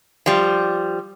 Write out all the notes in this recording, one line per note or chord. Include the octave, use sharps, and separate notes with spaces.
F3 G3